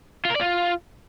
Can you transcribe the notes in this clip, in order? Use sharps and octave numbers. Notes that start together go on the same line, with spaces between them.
F4
A#4
D5
F4